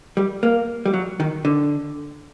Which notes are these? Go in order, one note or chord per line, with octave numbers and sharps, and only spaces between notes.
G3
A#3
G3
F#3
D#3
D3